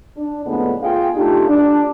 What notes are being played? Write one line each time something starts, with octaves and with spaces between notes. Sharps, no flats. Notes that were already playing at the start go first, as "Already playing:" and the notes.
D4
F2 A2 D3 G#3 B3
F4 G#4 F5 G5
A3 D4 D#4 F4 G4
D4